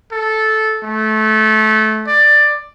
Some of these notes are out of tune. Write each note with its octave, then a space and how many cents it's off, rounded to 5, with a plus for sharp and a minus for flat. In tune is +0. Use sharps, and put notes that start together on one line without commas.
A4 -10
A3 -20
D5 +10